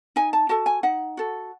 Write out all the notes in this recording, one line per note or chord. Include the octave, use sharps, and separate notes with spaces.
D#4 G#5
A5
F#4 A4 A5
G#5
D#4 F#5
F#4 A4